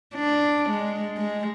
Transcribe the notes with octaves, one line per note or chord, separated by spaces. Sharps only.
D4
G#3
G#3